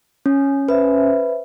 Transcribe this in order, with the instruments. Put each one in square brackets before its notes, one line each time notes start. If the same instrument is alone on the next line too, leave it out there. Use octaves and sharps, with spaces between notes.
[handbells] C#4
[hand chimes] B4 [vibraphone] C5 E5